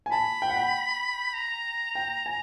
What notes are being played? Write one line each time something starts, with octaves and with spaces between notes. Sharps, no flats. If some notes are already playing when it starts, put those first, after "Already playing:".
G#5
A5 B5
G5
F#5
G5
A#5
G5
G#5